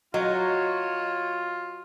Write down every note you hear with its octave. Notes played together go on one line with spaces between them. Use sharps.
F#3 F4 F#4 C#5 D#5